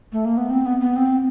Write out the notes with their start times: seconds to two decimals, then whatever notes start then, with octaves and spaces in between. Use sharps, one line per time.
0.12 A3
0.25 A#3
0.37 B3
0.50 C4
0.66 B3
0.81 B3
0.96 C4